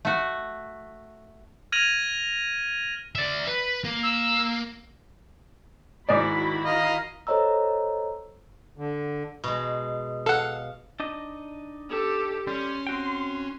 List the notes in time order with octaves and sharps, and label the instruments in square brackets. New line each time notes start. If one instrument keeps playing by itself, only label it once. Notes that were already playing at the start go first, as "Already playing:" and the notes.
[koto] A3 F#4
[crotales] F6 G#6 A#6 D#7 F7 F#7
[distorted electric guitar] D5 E5
B4
A#3
[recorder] E6
[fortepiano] G#2 D5 [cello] D#3 E4 [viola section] F#4 B5
[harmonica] D#5 F5 A#5
[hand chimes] A4 C5 C#5 D#5 A#5 E6
[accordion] D3
[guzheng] B2 G#3
[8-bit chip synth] A4 F#5 [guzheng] F5
[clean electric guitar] D4 D#4 D#5
[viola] G4 A4
[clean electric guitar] G3 [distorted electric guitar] C#4 [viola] C6
[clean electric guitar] C4 F#4 G5